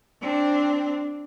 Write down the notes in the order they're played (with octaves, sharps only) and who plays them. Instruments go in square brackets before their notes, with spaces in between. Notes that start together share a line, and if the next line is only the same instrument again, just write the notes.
[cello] C4 D4